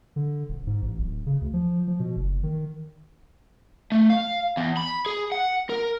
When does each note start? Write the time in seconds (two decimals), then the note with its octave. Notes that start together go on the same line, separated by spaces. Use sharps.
0.16 D3
0.49 D#1
0.67 G#2
0.82 A1
0.99 D1
1.26 C#3
1.41 D2
1.53 F3
1.88 F3
1.99 B2
2.17 F#1
2.43 D#3
3.92 A3
4.10 F5
4.57 E2
4.77 B5
5.06 G#4
5.32 F#5
5.69 A#4